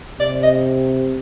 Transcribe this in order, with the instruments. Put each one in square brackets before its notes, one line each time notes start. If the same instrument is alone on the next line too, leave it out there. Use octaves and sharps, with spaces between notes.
[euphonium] C3 [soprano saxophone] D5
[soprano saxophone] D#5